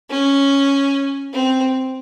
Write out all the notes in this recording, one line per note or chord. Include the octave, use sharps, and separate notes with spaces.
C#4
C4